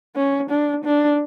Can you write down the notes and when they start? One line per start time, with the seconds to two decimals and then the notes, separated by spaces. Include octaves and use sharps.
0.16 C#4
0.50 D4
0.85 D4